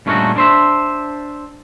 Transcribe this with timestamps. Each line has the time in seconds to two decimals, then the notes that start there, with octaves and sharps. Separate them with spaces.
0.06 G2 A#2 A3 C#4 D#4 F#4
0.36 D4 C5 E5